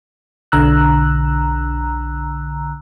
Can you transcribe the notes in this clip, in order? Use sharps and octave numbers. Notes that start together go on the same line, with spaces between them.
B1 D3 A#5 E6 F#6